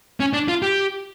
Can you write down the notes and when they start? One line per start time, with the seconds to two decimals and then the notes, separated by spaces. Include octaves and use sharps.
0.20 C#4
0.33 D4
0.48 F4
0.62 G4